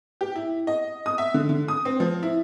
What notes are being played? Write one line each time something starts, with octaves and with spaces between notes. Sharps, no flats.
G4
E4
D#5
D#6
E5
D3
D3
D#6
C4
F3
E4